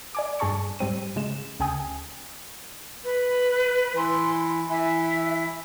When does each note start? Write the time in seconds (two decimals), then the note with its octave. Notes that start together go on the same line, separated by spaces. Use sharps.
0.15 D5 G#5 D6
0.39 G2 G#4 A5 C#6 C#7
0.79 G#2 G3 C4 D#7
1.16 C#3 G#3 E7
1.60 D2 C#3 G5 G#5 D#6
3.04 B4
3.97 E3 C6
4.70 E3 E5